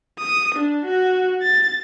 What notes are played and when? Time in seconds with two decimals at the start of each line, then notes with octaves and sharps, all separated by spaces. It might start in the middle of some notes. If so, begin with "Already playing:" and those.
0.19 D#6
0.55 D4
0.85 F#4
1.43 A6